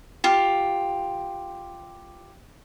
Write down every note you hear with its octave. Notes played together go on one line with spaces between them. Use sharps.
F4 G4